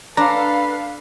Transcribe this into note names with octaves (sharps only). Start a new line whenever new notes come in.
D4 A4 B4 F5 A#5